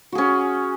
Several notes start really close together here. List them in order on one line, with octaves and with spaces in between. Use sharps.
F#4 G#4 C#4